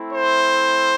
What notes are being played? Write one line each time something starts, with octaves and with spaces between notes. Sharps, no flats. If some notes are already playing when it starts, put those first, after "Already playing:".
Already playing: A3 C4 E4
C5